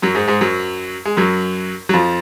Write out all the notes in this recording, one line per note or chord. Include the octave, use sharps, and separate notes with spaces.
F#2 F#3
G#2 G#3
G#2 G#3
F#2 F#3
G#3
F#2 F#3
F#3
F2 F3